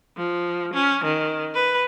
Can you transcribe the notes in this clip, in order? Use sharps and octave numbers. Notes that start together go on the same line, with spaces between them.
F3
C#4
D#3
B4